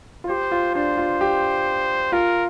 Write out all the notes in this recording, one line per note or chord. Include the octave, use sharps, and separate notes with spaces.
F4
G4 C5
F4
D4 C5
F4
G4
F4 A#4